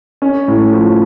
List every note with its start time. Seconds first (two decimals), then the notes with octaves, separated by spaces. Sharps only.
0.22 C#4
0.48 A2
0.73 F3